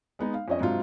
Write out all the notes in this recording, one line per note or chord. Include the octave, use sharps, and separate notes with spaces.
G#3 B3 D#4
F5
F2 C#4 D#5
G#2 C3 F#3 D4 F4